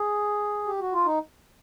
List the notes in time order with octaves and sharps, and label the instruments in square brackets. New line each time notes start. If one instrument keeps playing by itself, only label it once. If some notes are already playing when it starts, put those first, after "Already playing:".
Already playing: [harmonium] G#4
G4
F#4
F4
D#4